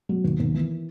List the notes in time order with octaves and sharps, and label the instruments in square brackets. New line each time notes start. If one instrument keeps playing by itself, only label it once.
[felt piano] F#3
D#2
D#2
E3